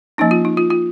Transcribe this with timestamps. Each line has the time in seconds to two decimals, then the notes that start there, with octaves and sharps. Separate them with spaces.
0.18 F3 A#3 C#4 D#4
0.31 F4
0.45 D#4
0.57 F4
0.70 F4